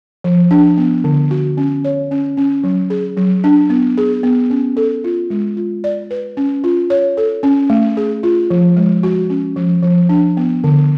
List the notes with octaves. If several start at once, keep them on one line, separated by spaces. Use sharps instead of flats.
F3
D4
B3
D3
F#4
C#4
C#5
C#4
C#4
F#3
G#4
F#3
D4
B3
G#4
B3
C#4
A4
F4
G#3
F4
D5
B4
C#4
F4
C#5
A4
C#4
A3
G#4
F4
F3
G#3
F#4
C#4
F3
F3
D4
B3
D3